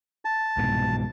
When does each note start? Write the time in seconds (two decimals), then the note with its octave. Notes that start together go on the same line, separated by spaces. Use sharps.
0.25 A5
0.57 C2 G#2 B2